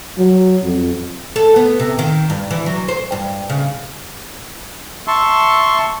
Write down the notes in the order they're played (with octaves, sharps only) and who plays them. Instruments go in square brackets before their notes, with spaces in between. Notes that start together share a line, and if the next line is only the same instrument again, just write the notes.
[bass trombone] F#3
F2
[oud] A4
B3
C3
D#3
G2
E3
F#3
C5
G2
C#3
[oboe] E5 [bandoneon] A5 C6 C#6